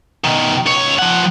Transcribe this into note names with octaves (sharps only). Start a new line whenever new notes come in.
B2 D#3
C#2 C#5
F3 F#5